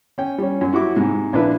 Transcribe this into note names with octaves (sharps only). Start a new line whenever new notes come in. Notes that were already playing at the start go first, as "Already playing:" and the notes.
C#4 G5
G3 C#4
F#2
E4 F#4 G4 D6
G#2 C3
A#1 D4 E4 B4